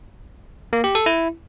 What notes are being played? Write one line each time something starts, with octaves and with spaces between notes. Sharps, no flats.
A#3
G4
A4
E4